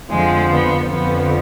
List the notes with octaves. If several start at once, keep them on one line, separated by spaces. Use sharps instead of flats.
F2 D3 F3 G#3
B3
F2 D3 F3 B3